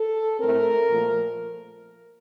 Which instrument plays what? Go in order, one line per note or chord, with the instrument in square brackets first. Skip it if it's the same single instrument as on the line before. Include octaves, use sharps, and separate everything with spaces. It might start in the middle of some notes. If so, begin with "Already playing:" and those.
Already playing: [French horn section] A4
A2 A3 C4 A#4
A#2 F3 A3